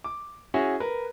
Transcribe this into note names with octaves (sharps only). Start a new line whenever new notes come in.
D6
C#4 E4 F#4 G#4
A#4 B4